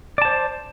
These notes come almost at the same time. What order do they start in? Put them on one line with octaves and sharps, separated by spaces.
D5 A5 C5